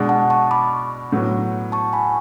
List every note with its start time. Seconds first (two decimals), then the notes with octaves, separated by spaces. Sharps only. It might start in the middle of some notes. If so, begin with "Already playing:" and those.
Already playing: B2 G#3 D4
0.09 F#5 A5
0.30 A5 C#6
0.51 B5 D6
1.12 A2 F#3 B3
1.72 A5 C#6
1.93 G#5 B5